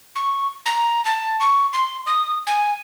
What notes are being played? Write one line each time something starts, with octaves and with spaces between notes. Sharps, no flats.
C#6
A#5
A5
C#6
C6
D#6
G#5